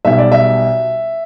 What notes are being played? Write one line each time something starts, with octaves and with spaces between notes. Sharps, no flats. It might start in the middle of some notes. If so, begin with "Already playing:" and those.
B1 B2 G3 E5
D5
E5